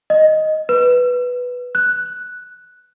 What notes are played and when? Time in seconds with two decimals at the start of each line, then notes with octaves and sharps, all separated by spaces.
0.10 D#5
0.69 B4
1.75 F#6